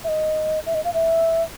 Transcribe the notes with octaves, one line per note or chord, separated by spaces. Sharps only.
E5
D#5
E5
D#5
F5
E5